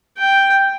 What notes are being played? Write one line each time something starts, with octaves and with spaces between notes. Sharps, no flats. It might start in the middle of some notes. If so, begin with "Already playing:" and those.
G5